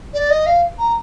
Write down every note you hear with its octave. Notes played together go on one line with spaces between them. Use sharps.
D5
D#5
F5
A#5